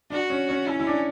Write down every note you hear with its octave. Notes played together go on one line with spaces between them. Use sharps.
D4 F#4
C#4
C#4
C#4 E4
E4
D4